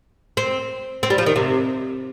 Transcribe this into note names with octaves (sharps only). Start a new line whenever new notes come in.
C4
C4
G3
F3
D#3
C3